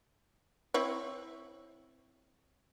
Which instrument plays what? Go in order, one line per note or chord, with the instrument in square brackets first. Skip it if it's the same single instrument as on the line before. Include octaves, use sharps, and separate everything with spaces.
[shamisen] C4 E4 C#5